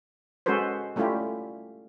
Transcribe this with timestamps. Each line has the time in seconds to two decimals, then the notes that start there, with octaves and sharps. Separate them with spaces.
0.46 G#3 C#4 F#4 A4 B4 C5
0.96 G3 A3 C#4 E4 F4 G4